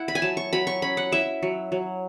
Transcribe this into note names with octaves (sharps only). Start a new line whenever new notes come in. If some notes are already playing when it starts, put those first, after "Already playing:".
Already playing: E4 F#5
B5
G#5
F#3 A5
C#6
F#3 B5
C#6
C#4 B5
F#5
E4 E5
F#3
F#3